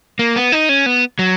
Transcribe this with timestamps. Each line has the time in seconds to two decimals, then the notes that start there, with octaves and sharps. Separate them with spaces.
0.19 A#3
0.36 B3
0.52 D#4
0.69 C#4
0.86 B3
1.19 F#3